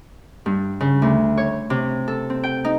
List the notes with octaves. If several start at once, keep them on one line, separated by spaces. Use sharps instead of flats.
G2
C#3
D2
C#5
C3
A4
C4
G5
D#4